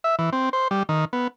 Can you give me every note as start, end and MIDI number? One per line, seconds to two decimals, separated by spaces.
0.04 0.16 76
0.19 0.30 52
0.33 0.49 60
0.53 0.68 72
0.71 0.83 55
0.89 1.05 51
1.13 1.28 59